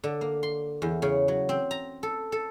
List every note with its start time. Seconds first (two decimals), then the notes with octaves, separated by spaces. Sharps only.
0.04 D3
0.21 A#3
0.43 C6
0.82 E2
1.02 C#3
1.28 F#3
1.49 C4
1.71 A#5
2.03 A4
2.32 A4